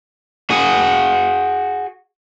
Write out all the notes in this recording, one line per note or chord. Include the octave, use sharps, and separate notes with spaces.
F#4 G#4